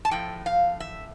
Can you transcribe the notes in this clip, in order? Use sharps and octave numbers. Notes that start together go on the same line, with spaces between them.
A5
A2 F3 A3 G5
F5
E5